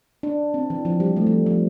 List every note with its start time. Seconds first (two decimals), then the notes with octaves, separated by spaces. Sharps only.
0.23 D4
0.54 C4
0.70 E3
0.85 F3
1.00 G3
1.16 A3
1.27 F3
1.46 F3